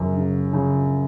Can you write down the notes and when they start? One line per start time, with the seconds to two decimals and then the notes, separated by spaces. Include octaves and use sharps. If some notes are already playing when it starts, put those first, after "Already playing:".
Already playing: F#2 C#3
0.17 C#3
0.53 C#3